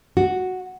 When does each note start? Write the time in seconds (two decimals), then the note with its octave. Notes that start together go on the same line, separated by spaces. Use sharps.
0.17 F#4